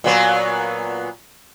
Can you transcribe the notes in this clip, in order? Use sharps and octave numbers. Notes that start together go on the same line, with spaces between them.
A#2 F#3 B3